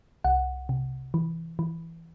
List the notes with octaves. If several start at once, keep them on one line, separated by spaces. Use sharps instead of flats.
C2 F#5
C3
E3
E3